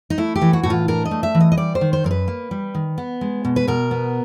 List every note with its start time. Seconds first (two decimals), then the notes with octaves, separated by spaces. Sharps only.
0.10 D#4
0.18 A3 E4
0.36 G4
0.41 E3
0.53 F#4
0.63 A2 F#4
0.70 F4
0.88 D4 A#4
1.05 D#5
1.11 A3
1.23 E5
1.35 E3
1.41 D#5
1.52 D#5
1.58 G3 D5
1.75 C5
1.81 D#3
1.93 C5
2.04 F#2 A#4
2.11 B4
2.28 A#3
2.51 G3
2.75 D#3
2.98 B3
3.21 G#3
3.45 B2
3.56 B4
3.67 B2 A#4
3.91 B3